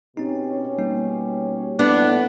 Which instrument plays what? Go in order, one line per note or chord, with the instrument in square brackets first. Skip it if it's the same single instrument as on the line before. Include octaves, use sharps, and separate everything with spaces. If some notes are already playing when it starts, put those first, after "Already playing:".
[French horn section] B2 C#4 G4 [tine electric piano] C4 D#4
[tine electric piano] G3 A#3 D#4
[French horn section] A2 [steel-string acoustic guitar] B3 [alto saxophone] D4